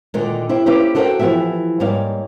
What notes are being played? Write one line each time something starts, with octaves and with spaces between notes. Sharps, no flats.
A#2 D3 D#3 G#3
E4 G4 C5
A#3 C#4 E4 G4 B4 C5
E4 F#4 A4 A#4 C5 G5
E3 F3 B3 G4 E5
G#2 G3 A#3 C#5 F5